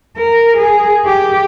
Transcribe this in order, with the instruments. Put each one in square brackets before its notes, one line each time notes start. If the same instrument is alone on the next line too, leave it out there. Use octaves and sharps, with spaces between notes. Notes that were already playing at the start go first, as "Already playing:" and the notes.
[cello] A#4
G#4
G4